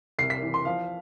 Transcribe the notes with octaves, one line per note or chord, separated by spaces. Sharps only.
C2 C7
B6
E3
C6
F3 F5